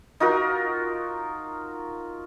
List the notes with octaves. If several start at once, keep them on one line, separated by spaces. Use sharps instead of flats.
D#4 F4 F#4 A#4